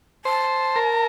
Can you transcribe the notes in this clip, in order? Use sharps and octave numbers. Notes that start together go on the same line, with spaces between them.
C5 A5
A#4